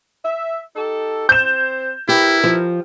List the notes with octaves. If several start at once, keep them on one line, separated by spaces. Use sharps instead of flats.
E5
D#4 G4 A4
C4 C5 G6 E7
E4 G4 A#4 B4
F3